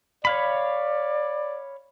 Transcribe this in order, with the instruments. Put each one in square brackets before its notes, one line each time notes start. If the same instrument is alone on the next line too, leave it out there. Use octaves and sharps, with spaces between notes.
[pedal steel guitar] C#5 F5 B5 [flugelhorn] D5